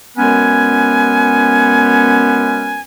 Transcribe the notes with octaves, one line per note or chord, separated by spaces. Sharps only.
F#2 G#3 B3 C#4 B4 G#5